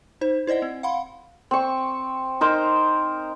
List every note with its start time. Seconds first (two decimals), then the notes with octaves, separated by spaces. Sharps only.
0.21 D#4 C5
0.47 E4 C5 D5 D#5 F#5
0.62 C4
0.83 F5 F#5 B5 C6
1.51 C4 C#6
2.41 D#4 A#4 C5